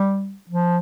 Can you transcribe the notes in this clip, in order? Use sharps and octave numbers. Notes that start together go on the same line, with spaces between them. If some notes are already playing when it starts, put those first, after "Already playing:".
Already playing: G3
F3